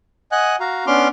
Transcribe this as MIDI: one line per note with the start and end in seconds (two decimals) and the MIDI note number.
0.32 0.56 75
0.32 0.56 78
0.32 0.56 80
0.32 0.56 90
0.60 0.85 66
0.60 0.85 77
0.60 0.85 82
0.87 1.08 59
0.87 1.08 61
0.87 1.08 62
0.87 1.08 84
0.87 1.08 86
0.87 1.08 89